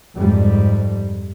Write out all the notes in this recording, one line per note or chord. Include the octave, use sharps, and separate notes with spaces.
F2 G#2 G3